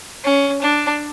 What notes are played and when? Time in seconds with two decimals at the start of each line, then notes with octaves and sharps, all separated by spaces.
0.24 C#4
0.62 D4